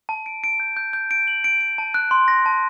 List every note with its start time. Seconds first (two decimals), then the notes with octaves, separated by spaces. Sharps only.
0.09 A5
0.26 D7
0.44 D7
0.60 G6
0.77 G6
0.93 G6
1.11 D7
1.28 F#7
1.44 D7
1.61 D7
1.78 A5
1.94 F#6
2.11 C6
2.28 A#6
2.46 A5